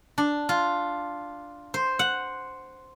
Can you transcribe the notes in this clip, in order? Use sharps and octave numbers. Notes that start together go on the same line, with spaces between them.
D4
F4
C5
F#5